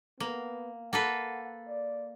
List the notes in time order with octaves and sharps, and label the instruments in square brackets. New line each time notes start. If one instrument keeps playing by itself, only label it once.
[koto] A#3 [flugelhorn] B3
[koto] A#3 A4 B4 [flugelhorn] F#5
[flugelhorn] D5